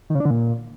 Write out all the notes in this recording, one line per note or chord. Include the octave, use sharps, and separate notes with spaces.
D#3
C#3
D4
D3
A#2